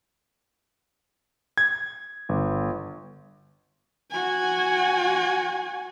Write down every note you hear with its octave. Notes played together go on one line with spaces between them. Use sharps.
G#6
G1
F#4 G#5